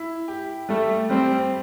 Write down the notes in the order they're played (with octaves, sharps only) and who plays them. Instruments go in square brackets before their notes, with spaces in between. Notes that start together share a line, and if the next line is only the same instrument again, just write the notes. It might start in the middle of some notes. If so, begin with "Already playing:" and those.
Already playing: [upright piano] E4
G4
[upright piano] G3 [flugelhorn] A3
[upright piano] G3 [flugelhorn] C4